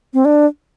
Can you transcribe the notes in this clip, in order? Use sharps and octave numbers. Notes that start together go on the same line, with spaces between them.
C4
D4